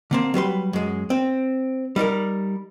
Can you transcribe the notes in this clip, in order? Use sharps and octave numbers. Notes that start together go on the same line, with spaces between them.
D3 A#3 C4
F#3 G3 B4 C6
F#2 G#3
C4
G3 D#4 A4 A#4